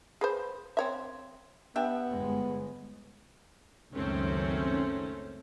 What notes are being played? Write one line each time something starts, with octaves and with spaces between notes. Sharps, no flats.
G#4 B4 C5
C4 C#5 E5
B3 D4 G4 E5
G1 G#3
C#2 F#2 D#3 A3 C4 C#4